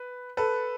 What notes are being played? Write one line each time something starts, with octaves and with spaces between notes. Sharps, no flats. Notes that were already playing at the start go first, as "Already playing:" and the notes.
Already playing: B4
A4 B4